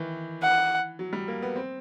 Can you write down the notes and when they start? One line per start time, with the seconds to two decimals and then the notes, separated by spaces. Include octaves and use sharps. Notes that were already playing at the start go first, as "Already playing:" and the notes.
Already playing: D#3 E3
0.42 F#5
0.99 F#3
1.13 G3
1.28 A#3
1.42 B3
1.56 C4